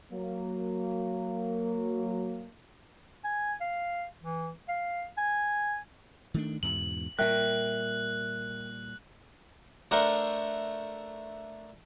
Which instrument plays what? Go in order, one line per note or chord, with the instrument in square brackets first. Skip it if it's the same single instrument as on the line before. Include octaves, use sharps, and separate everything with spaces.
[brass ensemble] F#3 A#3
[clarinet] G#5
F5
E3
F5
G#5
[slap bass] D#3 A3 D4
[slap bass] E2 G#2 B2 [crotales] F#7
[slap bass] A#2 G3 [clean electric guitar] A#4 E5 G5 [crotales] F#6
[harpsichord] A3 D4 A#4 C5 F#5